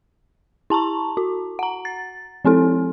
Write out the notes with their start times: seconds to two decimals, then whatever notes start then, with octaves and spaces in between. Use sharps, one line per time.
0.70 E4 A5 A#5 C#6
1.17 F#4
1.59 F#5 A#5
1.85 A6
2.45 F3 C4 E4 A4